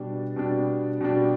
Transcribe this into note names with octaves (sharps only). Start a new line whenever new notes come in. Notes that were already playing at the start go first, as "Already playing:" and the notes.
Already playing: B2 G3 D4
B2 G3 D4
B2 G3 D4